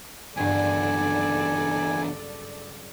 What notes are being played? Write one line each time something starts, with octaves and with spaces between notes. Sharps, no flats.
F#1 E2 G2 D3 A4 D5 G#5